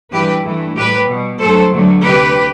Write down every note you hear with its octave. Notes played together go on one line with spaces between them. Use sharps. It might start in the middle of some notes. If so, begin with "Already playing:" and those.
G2 E3 G3 G4 B4
G2 E3 A3
A2 G3 G4 B4
B2 G3
G2 F#3 A3 A4 C5
G2 D3 F#3 A3
D2 C3 G3 G4 B4